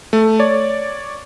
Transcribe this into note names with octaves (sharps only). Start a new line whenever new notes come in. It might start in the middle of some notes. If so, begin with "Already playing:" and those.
A3
C#5 D5